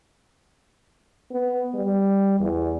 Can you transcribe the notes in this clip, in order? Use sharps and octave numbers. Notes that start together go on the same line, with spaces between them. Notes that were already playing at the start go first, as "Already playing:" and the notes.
B3
G3
E2